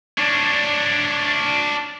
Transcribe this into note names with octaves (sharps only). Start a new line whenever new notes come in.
D4 C#5